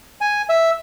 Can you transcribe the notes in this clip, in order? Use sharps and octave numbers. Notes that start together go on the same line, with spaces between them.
G#5
E5